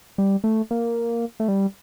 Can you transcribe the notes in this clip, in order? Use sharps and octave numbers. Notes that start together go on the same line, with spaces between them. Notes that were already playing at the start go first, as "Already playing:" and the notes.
G3
A3
A#3
A3
G3